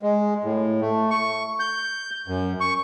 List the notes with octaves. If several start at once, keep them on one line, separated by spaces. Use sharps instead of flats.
G#3
A2
A3
C#6
G6
F#2
C#6